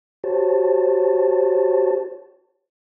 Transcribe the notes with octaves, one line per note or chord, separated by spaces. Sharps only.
F#4 G4 C5 C#5 A5